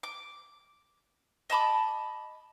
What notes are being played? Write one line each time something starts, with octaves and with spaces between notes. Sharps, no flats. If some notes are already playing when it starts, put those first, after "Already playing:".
D6
D#5 A5 B5 D6